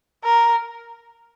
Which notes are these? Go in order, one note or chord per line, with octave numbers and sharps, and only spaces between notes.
A#4